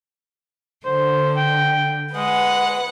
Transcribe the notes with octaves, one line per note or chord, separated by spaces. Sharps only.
D3 C5
G5
G#3 B4 F#5